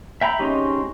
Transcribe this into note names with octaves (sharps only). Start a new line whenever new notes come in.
E5 G5 A#5 B5
G#3 C4 C#4 D#4 G4